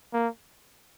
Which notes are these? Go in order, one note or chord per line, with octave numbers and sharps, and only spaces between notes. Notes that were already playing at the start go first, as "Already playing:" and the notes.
A#3